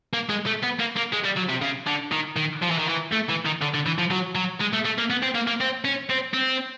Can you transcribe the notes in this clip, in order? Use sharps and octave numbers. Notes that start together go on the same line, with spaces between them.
A#3
G#3
A3
B3
A#3
A#3
G#3
G3
F#3
C3
C#3
D3
D#3
D#3
F3
E3
D#3
E3
A3
E3
D#3
D3
D3
E3
F3
F#3
F#3
G#3
A3
A3
A#3
B3
C4
A#3
A#3
C4
C#4
C4
C4